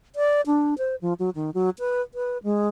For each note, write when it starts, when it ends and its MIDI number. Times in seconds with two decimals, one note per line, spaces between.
0.16 0.41 74
0.46 0.74 62
0.78 0.95 72
1.01 1.13 53
1.19 1.30 54
1.35 1.50 51
1.54 1.70 54
1.79 2.01 71
2.14 2.38 71
2.44 2.68 56